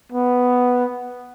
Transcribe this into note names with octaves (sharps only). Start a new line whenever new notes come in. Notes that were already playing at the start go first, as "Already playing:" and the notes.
B3